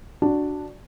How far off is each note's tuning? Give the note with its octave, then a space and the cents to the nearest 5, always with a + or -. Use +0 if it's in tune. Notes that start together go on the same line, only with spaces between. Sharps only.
D4 +0 F#4 -5